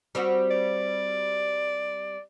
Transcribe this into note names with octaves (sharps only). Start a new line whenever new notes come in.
G3 C4 F#4
D5